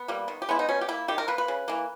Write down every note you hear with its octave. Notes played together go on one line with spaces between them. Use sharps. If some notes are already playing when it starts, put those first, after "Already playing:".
Already playing: B3
G3 A#3
D#3
G4
G#3 B3 E4
D#4
B2 C#4
G4
A#3 E4
D#3 G4
A#4
A#3 B4
B4
C#3
E3 A#3